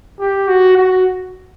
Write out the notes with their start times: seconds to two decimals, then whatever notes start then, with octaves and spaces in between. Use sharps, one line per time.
0.20 G4
0.48 F#4
0.78 F#4